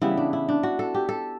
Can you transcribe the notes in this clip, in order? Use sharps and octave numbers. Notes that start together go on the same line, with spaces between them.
C#3 E3 G3 B3 E4
D4
E4
D4
F#4
A4
G4
A4